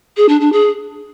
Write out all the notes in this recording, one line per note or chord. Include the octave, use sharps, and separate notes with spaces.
G#4
D4
D4
G#4